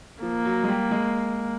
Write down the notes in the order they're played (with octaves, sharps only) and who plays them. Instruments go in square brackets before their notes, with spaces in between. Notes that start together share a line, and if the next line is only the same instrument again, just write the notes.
[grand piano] F3 [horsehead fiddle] A#3
[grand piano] F#3
G#3
G3
G#3